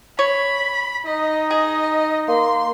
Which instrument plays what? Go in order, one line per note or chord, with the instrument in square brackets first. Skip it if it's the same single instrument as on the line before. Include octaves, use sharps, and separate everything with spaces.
[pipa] C#5 [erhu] B5
[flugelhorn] D#4 [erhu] D#5
[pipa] G#4 [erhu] D#5
[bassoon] A#3 [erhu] C6